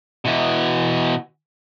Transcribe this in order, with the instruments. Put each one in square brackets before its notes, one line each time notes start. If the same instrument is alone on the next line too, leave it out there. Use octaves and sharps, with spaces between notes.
[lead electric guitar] B2 E3